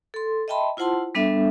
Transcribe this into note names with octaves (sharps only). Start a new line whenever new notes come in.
A4 C6
D#5 E5 G5 A5 B5 C6
E4 F4 C5 F#5 A5 C6
G3 B3 D4 A4 E5